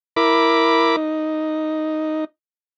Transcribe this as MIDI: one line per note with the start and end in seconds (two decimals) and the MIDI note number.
0.16 0.96 64
0.16 0.96 70
0.16 0.96 83
0.16 0.96 86
0.97 2.25 63